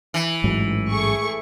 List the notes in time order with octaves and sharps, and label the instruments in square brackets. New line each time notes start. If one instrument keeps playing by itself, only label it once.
[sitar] E3
[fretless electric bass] A1 G#2 F#3
[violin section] A3 G#4 C#6